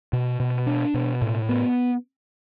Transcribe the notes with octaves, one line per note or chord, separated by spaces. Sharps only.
B2
B2
D4
B2
A2
B3